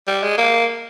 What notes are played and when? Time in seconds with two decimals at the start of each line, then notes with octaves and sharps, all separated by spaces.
0.07 G3
0.23 G#3
0.38 A#3